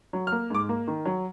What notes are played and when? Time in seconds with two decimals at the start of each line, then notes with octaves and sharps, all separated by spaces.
0.13 F#3
0.27 F6
0.32 A#3
0.50 G#2 D6
0.69 A#3
0.88 D#3
1.06 F#3